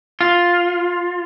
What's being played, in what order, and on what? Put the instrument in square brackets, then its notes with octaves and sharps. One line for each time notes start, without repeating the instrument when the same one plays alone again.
[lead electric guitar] F4